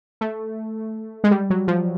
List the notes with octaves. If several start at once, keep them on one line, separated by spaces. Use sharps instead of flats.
A3
G#3
G3
F#3
F3